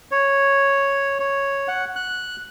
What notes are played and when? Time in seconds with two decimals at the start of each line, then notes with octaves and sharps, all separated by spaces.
0.11 C#5
1.20 C#5
1.68 F#5
1.96 F#6